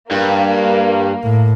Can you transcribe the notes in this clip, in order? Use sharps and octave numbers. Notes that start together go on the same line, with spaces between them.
G2 A#3
A2